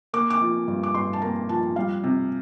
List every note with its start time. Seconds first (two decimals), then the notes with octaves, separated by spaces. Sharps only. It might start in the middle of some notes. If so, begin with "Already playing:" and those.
0.13 A#3 D6
0.30 D6
0.41 F3
0.68 G2
0.83 D6
0.94 G2 C6
1.13 A5
1.22 A#3 A#5
1.49 F3 A5
1.76 G3 F5
2.03 C3